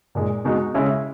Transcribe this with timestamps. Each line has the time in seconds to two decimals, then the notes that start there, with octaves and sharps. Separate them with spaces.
0.15 A#2 G#3 D#4
0.45 B2 G#3 D#4 F#4
0.74 C#3 G#3 C#4 E4